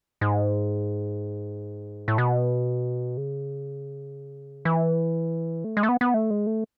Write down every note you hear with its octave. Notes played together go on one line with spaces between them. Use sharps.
G#2
A2
B2
C#3
E3
A3
G#3
A3
B3
B3
A3
G#3
A3